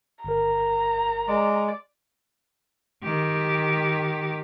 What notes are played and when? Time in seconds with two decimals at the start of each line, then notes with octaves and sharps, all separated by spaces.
0.24 G1 A#4 A#5
1.28 G#3 D5
3.03 D#3 G4